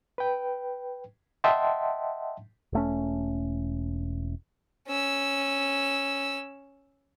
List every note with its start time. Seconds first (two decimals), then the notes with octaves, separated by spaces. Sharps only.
0.18 B4 G5
1.44 D#5 E5 F#5 G5 A5 C6
2.73 E1 A3 C#4
4.88 C#4 E6